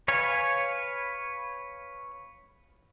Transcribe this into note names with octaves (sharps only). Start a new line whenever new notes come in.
B4 C#5 F5 G#5